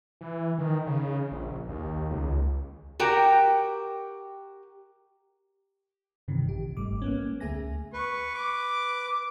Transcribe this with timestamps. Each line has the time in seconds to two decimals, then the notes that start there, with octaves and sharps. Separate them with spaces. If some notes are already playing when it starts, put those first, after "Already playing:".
0.21 E3
0.59 D#3
0.87 C#3
1.32 A#1
1.69 D#2
2.10 C#2
3.00 F#4 G4 A#4 G5
6.28 G2 C3 D#3 E3
6.46 A#1 G4
6.77 G1 G#2 G3 A3 D6
7.02 A#3 B3 C#4
7.40 D2 A3 G#4 E5 G#5 A#6
7.93 B4 C#6
8.35 D6